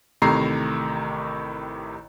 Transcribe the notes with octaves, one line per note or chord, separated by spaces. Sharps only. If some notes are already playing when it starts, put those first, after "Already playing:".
A1 A2 C3 D#3 A#5 C7